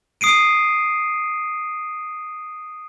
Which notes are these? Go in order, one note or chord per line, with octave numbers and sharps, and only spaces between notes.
D#6 C7 D7 D#7